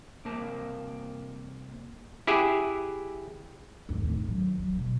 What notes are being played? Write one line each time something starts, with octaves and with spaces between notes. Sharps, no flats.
C2 A#3 C4 A#4 A5
E4 G4 G#4 E5 F#5
G#1 D#2
A2
D#3 F#3
F#3
B2 A#3